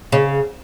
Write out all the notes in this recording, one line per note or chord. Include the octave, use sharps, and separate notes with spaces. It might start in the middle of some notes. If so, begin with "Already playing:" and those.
C#3